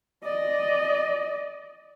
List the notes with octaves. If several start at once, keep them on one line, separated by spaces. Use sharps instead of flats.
D5 D#5